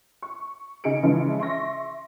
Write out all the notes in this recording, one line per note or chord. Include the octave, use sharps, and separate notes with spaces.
C#6
C#3 D#4 G#4 C#7 D7
C#3 E3 F3 G#3
E5 C6 C#6 A#6